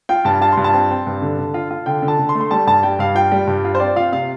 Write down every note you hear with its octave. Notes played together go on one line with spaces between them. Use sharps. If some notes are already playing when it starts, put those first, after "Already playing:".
F4 G5
G2 A5
F4 A5
C6
G2
A5
C4
C4
G2
D3
D3
F4
F4
D3 G5
D3
A5
D3
C6
A3
C6
G3 A5
G2 A5
G3 G5
G2 F5
F4 G5
G3
G2
F4
C5
C4 D5
F4 F5
C3 F5